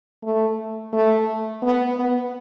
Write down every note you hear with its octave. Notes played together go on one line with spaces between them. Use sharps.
A3
A3
B3
B3